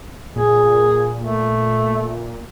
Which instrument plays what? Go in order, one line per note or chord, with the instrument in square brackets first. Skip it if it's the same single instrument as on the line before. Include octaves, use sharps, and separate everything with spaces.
[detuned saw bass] A#2 [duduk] G#4
[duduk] A3